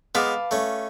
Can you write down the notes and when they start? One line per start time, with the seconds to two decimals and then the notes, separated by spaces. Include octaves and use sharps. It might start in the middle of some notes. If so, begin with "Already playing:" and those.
0.15 G#3 B3 B4 F5 A5 D6
0.51 A3 C#4